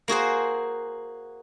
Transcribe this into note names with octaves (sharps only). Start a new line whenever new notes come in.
A#3 F#4 G#4 C5